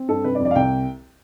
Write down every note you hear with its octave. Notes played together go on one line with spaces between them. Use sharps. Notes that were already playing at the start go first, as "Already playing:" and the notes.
Already playing: C4
G2 A4
C3 B4
D5
F2
D5
F5
C2 G5